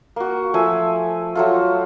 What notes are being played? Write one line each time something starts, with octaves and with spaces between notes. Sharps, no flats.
A#3 F#4
F3 A3 G#5 E6
F#3 A3 F4